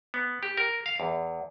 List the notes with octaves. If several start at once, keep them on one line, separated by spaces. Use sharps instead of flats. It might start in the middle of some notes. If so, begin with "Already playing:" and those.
B3
G4
A#4
F5
E2